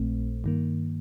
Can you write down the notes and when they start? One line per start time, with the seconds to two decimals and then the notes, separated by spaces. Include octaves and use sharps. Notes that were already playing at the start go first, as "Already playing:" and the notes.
Already playing: A#1 A#2 A3 C4
0.44 G2 D#3 A#3